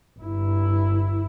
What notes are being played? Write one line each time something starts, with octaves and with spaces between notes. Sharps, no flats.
G1 E4